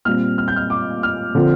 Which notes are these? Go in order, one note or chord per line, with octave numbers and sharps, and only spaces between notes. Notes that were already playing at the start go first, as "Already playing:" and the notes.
A#2 G3 C4 F6
F6
G6
F6
D6
F6
D3 F3 C4